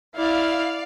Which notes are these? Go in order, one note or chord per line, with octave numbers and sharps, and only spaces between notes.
E4 D5 F5